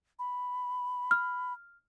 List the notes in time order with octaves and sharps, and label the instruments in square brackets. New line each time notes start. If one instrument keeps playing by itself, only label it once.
[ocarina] B5
[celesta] F6